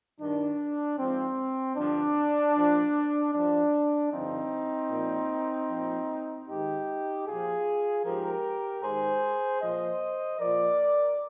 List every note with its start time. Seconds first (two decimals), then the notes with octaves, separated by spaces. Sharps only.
0.19 G2 D#3 D4
0.97 G#2 F3 C4
1.76 G2 D3 F3 D4
2.55 A#2 F3
3.33 G2 F3 D4
4.12 G2 D3 F3 C4 D#4
4.89 A#2 F3
5.69 A#2 F3
6.47 G#2 D#3 D#4 G4
7.25 A#2 F3 F4 G#4
8.04 G#2 F3 G4 A#4
8.83 G#2 D#3 G#4 C5
9.61 A#2 F3 C5 D#5
10.39 A#2 F3 A#4 D5